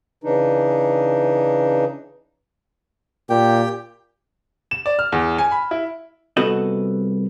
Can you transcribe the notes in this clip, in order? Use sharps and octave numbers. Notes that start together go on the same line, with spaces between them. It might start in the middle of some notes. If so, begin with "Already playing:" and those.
C#3 E3 D4 D#4
A#2 G4 G5
E7
D5
F6
E2
G#5
B5
E4
C2 B3 F#4 A4 D#5